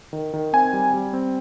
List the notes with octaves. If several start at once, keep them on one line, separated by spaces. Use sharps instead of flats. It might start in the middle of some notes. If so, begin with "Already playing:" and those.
D#3
D#3
C4 G#5
G3
G3
C4